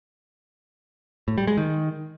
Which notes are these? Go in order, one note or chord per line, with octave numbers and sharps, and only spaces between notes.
A2
G3
G#3
D#3